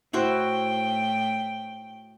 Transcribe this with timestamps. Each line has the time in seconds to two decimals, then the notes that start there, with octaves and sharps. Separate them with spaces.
0.13 A2 E4 F#4 C5 G5